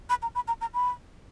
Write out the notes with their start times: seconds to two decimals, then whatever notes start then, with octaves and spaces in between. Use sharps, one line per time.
0.10 B5
0.22 A#5
0.35 B5
0.48 A#5
0.61 A#5
0.74 B5